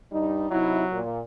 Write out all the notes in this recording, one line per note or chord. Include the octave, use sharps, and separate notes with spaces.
G2 G3 D#4
C3 F#3 D#4 E4
A#2